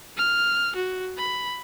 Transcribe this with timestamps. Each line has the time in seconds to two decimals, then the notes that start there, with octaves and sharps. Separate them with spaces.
0.18 F6
0.76 F#4
1.18 B5